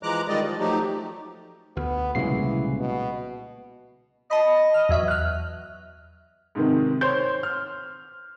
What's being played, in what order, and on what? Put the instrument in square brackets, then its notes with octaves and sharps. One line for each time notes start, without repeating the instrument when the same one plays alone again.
[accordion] E3 F3 G#3 A#5 D6 F#6
D#3 F3 G3 G#3 D5 D#5
F3
F3 F#3 A3 D#4 G4
[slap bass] D2 [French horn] B3
[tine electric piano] C2 C#3 C7 [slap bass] A#2 F#3 G#3 [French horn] E3
[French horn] B2
[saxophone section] D#5 [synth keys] A5 B5
[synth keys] F6
E2 F#3 E5
F6 F#6
[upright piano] G#2 C3 D#3
C5 C#5 C6 G6
F6